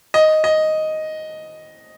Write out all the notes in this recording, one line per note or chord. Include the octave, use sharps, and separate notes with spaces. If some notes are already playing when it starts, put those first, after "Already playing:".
D#5
D#5